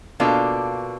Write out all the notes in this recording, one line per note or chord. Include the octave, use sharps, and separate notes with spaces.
B2 A#3 D4 F4 A4